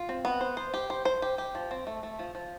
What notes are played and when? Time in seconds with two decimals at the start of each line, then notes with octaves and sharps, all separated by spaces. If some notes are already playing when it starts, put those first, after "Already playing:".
Already playing: F4
0.09 C4
0.25 B3
0.41 C5
0.57 C5
0.74 G4
0.90 C5
1.05 C5
1.22 G4
1.38 G4
1.55 F3
1.71 C4
1.87 A3
2.03 A3
2.19 F3
2.35 F3